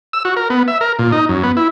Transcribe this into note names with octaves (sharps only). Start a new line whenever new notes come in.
E6
F#4
A#4
B3
E5
A#4
A#2
D#4
F#2
B3
E4